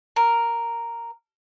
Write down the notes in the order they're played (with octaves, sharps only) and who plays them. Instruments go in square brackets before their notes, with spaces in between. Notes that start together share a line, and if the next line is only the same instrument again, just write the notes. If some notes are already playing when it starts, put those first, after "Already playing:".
[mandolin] A#4